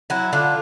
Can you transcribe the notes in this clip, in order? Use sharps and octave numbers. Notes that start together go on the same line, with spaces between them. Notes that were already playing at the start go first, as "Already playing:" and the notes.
F#3 E4
D3 F4